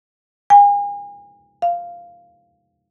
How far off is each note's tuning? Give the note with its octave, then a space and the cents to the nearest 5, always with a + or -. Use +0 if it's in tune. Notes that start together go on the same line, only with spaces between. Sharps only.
G#5 -40
F5 -5